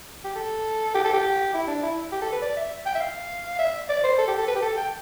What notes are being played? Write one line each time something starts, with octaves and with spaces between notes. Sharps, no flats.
G4
A4
G4
A4
G4
E4
D4
E4
G4
A4
B4
D5
E5
G5
E5
F5
E5
D5
C5
A4
G4
A4
B4
G4
A4
G5